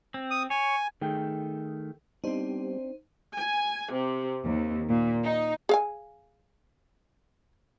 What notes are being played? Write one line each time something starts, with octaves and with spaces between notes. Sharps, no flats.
C4
D#6
C#5 G#5
D#3 A3 G#4 G5
G3 B3 C4 D4 D#4 G4 C5
G#5
C3
D#2
A#2
D#4
G#4 F5 G#5